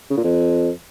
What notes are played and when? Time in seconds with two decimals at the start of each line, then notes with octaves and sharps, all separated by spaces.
0.10 C#3
0.17 A#2
0.24 F2